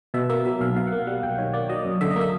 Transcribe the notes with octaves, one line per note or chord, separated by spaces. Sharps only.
B2 E5
A#3 E5
F#3 E5
B1 F5
B2 F5
F#5
A#3
G3 F#5
B1 G5
D#3 C#5
A#3 D5
F#3 D#5
F#2
D3 E5
D#5
A#3
E5